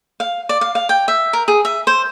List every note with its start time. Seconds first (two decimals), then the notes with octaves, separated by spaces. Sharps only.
0.20 F5
0.49 D5
0.61 F5
0.75 F5
0.89 G5
1.08 E5
1.33 A#4
1.48 G#4
1.65 E5
1.87 C5